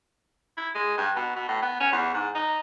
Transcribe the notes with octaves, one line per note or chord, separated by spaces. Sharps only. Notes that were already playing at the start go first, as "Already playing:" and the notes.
E4
G#3
G2
B2
B2
A2
B3
C#4
E2
G#2
D#4